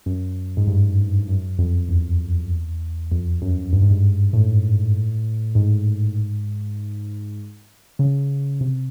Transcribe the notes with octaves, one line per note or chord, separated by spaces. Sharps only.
F#2
G#2
G2
F#2
F2
E2
F2
F#2
G2
G#2
G2
A2
G#2
C#3
C3